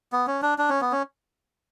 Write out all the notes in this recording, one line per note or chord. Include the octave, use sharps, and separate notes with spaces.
B3
C#4
D4
D4
C#4
B3
C#4